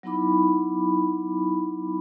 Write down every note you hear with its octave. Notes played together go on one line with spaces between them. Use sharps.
F#3 B3 D#4 E4 B5 D6